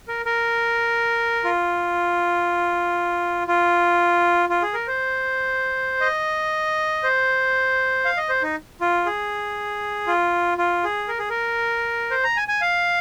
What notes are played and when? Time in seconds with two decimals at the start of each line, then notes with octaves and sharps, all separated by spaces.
0.08 A#4
0.26 A#4
1.44 F4
3.47 F4
4.49 F4
4.62 G#4
4.74 A#4
4.87 C5
6.01 D#5
7.03 C5
8.05 F5
8.17 D#5
8.29 C5
8.42 D#4
8.81 F4
9.06 G#4
10.07 F4
10.58 F4
10.84 G#4
11.08 A#4
11.19 G#4
11.30 A#4
12.11 C5
12.24 A#5
12.37 G#5
12.48 G#5
12.61 F5